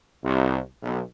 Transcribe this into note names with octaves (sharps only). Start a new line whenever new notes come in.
C2
B1